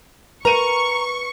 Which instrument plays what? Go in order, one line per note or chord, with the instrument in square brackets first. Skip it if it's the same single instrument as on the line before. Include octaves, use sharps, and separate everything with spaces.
[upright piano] A#4 D#7 [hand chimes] B4 [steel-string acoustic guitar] A#5 [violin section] C#6